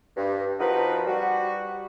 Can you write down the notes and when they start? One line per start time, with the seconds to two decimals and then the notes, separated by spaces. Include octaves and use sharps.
0.17 G2
0.60 F3 C4 D#4 F#4 A#4 B4
1.07 G3 F#4